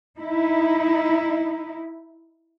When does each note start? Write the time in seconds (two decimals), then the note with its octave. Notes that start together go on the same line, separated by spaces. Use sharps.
0.18 D#4 E4